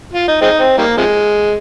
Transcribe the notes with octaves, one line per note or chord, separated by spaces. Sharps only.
F4
D#4
G#3 C4 D#4
C4
D#3 G3 A#3
C3 F3 G#3